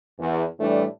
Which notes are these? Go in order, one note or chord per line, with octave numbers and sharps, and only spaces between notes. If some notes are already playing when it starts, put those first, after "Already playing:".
E2
A2 E3 G3 A3 D4